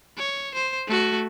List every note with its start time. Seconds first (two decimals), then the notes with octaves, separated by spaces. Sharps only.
0.18 C#5
0.55 C5
0.88 A3 F#4